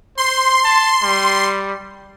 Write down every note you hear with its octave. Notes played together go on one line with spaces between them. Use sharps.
C5 C6
A5
G3